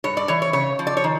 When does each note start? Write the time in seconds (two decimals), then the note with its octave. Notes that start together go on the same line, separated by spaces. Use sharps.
0.04 G2 C#5
0.17 D5
0.28 E3 C#5
0.42 C#5
0.53 C#3 C#5
0.79 F3
0.87 D5
0.97 C#5
1.04 D#3